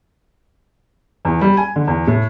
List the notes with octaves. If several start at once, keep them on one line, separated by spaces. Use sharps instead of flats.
E2
G3
G#5
D3
E2
A2